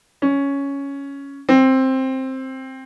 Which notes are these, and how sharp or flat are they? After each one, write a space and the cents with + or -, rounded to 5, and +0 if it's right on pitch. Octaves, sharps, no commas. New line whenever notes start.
C#4 +5
C4 +10